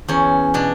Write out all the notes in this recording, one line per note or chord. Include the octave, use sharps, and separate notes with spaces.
E2 C#4
B2 D4